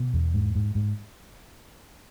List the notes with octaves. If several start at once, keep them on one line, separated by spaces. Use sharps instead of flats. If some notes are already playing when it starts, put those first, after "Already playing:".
Already playing: B2
E2
G#2
G#2
G#2